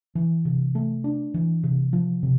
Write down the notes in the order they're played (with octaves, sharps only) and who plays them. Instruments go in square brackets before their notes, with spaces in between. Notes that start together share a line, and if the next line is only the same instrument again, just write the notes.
[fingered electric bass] E3
C3
A3
D4
E3
C3
F3
C3